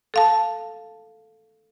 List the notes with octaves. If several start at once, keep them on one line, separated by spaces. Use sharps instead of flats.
A4 F5 A5